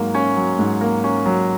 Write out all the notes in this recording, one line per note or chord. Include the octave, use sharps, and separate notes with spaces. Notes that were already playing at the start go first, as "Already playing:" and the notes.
Already playing: G#2 F#3 A#3
C#4
F#3
G#2
A#3
C#4
F#3